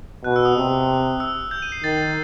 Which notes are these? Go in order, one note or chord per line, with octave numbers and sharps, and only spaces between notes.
B2 F#6
E6
D#6
C3
E6
G6
D#7
C7
D#3 A6